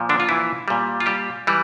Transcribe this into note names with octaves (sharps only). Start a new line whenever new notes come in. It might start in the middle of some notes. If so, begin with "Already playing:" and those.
Already playing: A#2 F3
D3 D4
F4
E3 E4
A#2 G3
F4
G3 G4
E3 G3